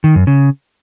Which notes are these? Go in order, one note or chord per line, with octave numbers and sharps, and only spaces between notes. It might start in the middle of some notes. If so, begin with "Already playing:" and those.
D#3
F#2
C#3